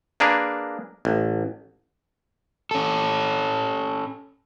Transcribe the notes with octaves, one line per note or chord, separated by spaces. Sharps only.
A#3 D4 G#4 A#4 B4
A1
C#4 A4